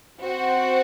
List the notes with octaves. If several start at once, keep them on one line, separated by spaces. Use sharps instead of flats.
C4 F#4 C5 F#5